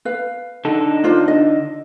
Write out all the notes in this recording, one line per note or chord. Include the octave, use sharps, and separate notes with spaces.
B4 F5
D3 D#4 A4
D4 F4 C5
D#5